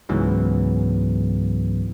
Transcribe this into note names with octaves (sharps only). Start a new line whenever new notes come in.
C#2 G#2 C#3 E3 F#3 B3